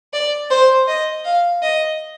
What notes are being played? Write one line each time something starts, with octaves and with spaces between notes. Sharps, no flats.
D5
C5
D#5
F5
D#5